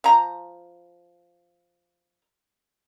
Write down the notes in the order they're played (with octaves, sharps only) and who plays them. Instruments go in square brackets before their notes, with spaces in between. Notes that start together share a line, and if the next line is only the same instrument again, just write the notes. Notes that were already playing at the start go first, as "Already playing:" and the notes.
[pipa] F3 A#5